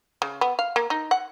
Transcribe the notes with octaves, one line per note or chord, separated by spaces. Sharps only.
C#3
B3
F5
A#3
D#4
F#5